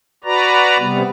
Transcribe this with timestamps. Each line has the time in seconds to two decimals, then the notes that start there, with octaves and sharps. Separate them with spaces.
0.24 F#4 B4 D5 A#5
0.79 C3 G3 B3